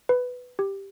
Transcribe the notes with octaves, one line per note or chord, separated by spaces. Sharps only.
B4
G4